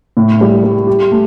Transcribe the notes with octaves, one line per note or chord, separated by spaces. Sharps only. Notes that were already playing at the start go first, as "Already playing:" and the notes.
A2
G3
G3
G4
A3